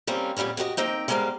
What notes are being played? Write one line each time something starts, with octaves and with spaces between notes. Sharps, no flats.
G3 A#3 C4 C#4
F2 A#2 G3 B3 C#4
F#4 G4 B4 D#5
A#3 C4 D#4 G5
G3 G#3 B3 A#4 C5 F5